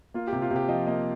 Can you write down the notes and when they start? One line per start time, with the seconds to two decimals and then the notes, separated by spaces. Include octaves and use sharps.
0.14 A#3 F4
0.27 G4
0.33 C3
0.42 F4
0.51 C3
0.56 G4
0.68 F3 D#5
0.87 A#3 D#5